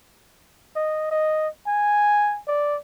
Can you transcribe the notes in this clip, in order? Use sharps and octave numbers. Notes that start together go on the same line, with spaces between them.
D#5
D#5
G#5
D5